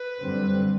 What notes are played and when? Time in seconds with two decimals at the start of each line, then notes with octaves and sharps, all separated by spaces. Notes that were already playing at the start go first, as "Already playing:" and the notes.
Already playing: B4
0.21 F#2 D3 G3 C4